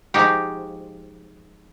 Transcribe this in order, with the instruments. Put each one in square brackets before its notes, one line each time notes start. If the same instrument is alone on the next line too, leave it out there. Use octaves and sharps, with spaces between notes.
[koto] F3 G#3 D#4 F#4 G4